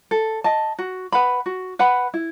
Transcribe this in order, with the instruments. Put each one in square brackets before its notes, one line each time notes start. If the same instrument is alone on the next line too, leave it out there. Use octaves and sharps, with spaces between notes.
[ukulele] A4
D#5 A5
F#4
B4 F#5 B5
F#4
B4 F#5 B5
E4